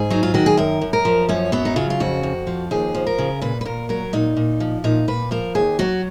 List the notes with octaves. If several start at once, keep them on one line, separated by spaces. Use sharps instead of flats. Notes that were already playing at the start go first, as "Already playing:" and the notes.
Already playing: G#2 G#4
F#3 D#4
F4
D#3 F#4
G#4
F#2 A#4
F#2
A#4
F3
F#2 C#4
F#3 B3
D#4
C#3 F4
F4
F2 F#4
F2
F3
D#2 G#4
F3
A#4
C#3
A#2 B4
B4
A#2 A#4
F#3 A#4
A#2 D#4
A#2
F3
A#2 D#4
A#2 B4
F3 A#4
D#2 G#4
F#3 F#4